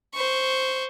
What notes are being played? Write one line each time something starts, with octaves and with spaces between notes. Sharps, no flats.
C5 C#6